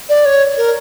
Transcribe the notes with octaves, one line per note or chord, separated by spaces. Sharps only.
D5
C#5
A#4